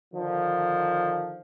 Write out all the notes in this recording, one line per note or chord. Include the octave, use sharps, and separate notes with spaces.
D3 D#3 F3